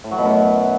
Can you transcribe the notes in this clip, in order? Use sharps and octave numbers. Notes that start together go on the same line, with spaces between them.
A2
F#3
B2
F#2